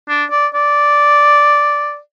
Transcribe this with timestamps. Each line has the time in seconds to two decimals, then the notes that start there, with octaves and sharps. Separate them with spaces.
0.08 D4
0.31 D5
0.54 D5